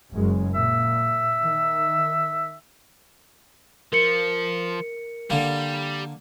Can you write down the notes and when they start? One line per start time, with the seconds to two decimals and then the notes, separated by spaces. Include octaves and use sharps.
0.13 F#1 F#2 G#3
0.55 A#2 E5
1.41 D#3
3.93 F3 A#4 C#7
5.30 D3 G3 A#3